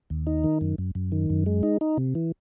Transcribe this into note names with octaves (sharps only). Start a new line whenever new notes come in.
D#2
D#4
D#3
F#2
F#2
F#2
D#3
F#2
G#3
D#4
D#4
C3
E3